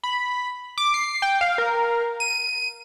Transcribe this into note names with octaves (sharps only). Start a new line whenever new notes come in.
B5
D6
C7
G5
F5
A#4
D#7